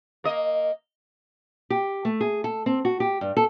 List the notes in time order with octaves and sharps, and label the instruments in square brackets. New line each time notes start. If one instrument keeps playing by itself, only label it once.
[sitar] A#3 D#5
[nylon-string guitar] G4
A3
G#4
A4
C4
F#4
G4
G2
A4